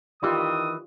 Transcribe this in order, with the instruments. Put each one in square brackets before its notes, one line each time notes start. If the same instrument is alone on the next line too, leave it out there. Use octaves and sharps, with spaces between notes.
[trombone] D#3 [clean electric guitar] E3 [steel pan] F4 G4 D5 [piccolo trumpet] D#6